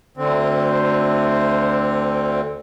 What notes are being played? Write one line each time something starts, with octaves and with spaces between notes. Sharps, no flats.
D2 D3 C4